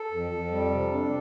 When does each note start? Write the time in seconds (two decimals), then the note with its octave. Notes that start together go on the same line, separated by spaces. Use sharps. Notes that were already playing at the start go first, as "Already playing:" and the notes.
Already playing: A4
0.11 F2
0.31 F2
0.51 G3
0.71 C3
0.92 D4